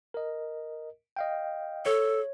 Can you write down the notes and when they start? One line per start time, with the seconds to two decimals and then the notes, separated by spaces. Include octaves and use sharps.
0.14 A#4 D#5
1.17 D#5 F5 G5
1.85 A4 C#5